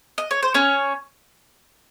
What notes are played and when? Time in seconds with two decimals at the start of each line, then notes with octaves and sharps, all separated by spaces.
0.18 D#5
0.31 C#5
0.43 C5
0.54 C#4 C#5